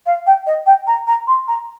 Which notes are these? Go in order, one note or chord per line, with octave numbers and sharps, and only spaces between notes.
F5
G5
D#5
G5
A#5
A#5
C6
A#5